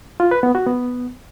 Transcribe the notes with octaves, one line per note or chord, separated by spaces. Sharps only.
F4
B4
B3
F#4
B3